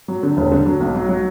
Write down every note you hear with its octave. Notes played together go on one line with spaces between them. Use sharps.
F#3
D3
E1
D3
F#3
B1
F#3
F#3